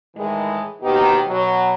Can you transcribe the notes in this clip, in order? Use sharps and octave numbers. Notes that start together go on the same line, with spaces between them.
A2 D#3 E3 G#3
D#2 B2 D#3 B3 D#4 G4
B2 F#3